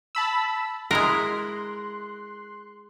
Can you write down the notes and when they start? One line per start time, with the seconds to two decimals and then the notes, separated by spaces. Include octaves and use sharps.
0.15 A5 B5 E6
0.91 G#3 E4 A#4 C6 F#6